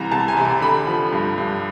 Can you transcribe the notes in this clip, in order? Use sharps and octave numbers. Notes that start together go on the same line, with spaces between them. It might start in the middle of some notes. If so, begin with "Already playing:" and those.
Already playing: C2 E3 A#5
C2 A5
G#5
C3
A#5
D3 B5
F3
G2
G2